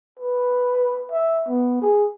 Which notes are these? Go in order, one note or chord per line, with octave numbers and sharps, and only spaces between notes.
B4
E5
B3
G#4